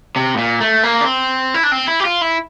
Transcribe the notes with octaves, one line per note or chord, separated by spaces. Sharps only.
C3
A2
A#2
A3
A#3
D4
C4
E4
D4
C4
E4
G4
F4
E4